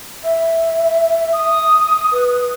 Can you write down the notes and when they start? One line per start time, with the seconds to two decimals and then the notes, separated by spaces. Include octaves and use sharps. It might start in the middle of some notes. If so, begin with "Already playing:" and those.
0.24 E5
1.33 D#6
2.12 B4